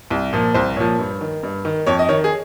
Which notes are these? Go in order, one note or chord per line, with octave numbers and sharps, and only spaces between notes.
C2
A#2 F3
C2 C5
A#2 F3 C#5
G2
D#3
G2
D#3
F2 C#5
D#5
D#3 C#5
G#4